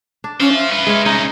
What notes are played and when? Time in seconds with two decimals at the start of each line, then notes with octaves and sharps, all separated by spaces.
0.24 D4
0.40 C#4 C5 F5
0.54 E5
0.71 B4 F5
0.87 G#3 C#5
1.06 C2 C#4 D#4